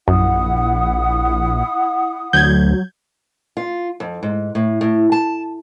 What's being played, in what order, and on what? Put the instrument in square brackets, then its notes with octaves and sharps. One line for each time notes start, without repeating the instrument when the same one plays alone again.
[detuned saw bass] A#1 [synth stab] F#2 [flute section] E4 F#5 D#6
[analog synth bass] D2 [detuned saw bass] F#3 [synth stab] G6 G#6
[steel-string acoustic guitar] F4
F2
G#2
A2
A2
A5